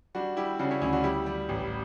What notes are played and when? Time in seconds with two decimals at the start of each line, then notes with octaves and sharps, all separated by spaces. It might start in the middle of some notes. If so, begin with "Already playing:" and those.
0.15 G3 D4 F#4
0.37 G3 E4 G4
0.59 C#3 D4 F#4
0.71 C#4 E4
0.81 D2 C#4 E4
0.93 D4 F#4
1.04 G3 E4 G4
1.26 G3
1.49 A1